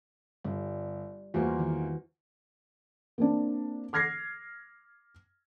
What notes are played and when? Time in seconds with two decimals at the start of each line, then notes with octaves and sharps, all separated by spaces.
0.45 G1 G3
1.34 E2 G3 A#3 F4 F#4 C5
1.59 D#3 E3
3.18 A#3 C4 D4
3.93 D6 F6 G#6 A#6 C7